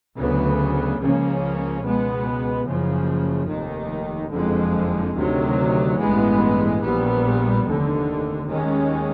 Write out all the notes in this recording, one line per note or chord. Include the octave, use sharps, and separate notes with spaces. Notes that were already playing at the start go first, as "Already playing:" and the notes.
D2 C#3 F#3 B3
C#2 C#3 F3 A#3 C#4
C#2 B2 G#3 B3
F#1 F#2 C#3 F3
F1 D#2 D#3
F#1 F2 D3 F3 G#3
D2 C3 D#3 F#3
A1 G2 E3 G#3 B3
A#1 A#2 G3 B3
F1 D#2 D3
D#2 D#3 G#3 C#4